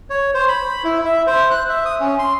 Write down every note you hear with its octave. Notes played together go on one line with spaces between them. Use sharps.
C#5
C5
B5
E4
E5
C5
F#6
E5
D#6
C#4
C6